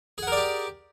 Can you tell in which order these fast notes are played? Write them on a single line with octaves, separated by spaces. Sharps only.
G#4 F#5 A#4 D5 G4